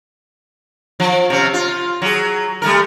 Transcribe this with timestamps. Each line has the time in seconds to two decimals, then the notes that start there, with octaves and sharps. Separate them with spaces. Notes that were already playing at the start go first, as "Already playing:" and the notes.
1.00 F3
1.30 C3 C#4
1.54 F4
2.02 F#3 G#4
2.62 G3 A3 A#4